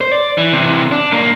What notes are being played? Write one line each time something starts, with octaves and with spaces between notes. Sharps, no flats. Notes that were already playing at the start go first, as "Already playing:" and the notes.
C5
D5
E3
C3 E3
D4
B1 A#3